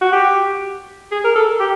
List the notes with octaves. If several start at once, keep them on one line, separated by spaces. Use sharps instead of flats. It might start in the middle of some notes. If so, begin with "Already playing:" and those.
F#4
G4
G#4
A#4
A4
G4